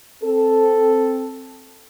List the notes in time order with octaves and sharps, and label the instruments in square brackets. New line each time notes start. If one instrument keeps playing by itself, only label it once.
[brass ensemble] C4 A4